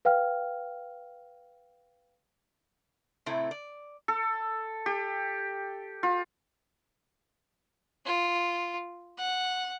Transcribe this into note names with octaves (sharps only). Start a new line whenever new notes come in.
B4 F5 G5 F6
A2 C3 A3 C4 E4
D5
A4
G4
F4
F4
F#5